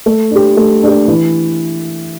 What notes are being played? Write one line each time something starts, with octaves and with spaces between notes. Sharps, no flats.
A3
D4 G4
A3
D4 G4
E3